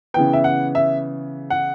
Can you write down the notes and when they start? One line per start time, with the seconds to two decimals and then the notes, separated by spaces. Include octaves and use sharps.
0.14 C#3 E3 B3 G5
0.33 E5
0.44 F#5
0.75 E5
1.50 F#5